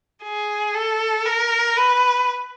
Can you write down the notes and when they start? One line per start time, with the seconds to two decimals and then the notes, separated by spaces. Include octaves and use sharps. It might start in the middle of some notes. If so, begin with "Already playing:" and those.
0.23 G#4
0.74 A4
1.25 A#4
1.77 B4